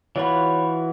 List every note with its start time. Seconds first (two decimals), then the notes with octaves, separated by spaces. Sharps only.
0.16 E3 F4 F#4 C#5 B5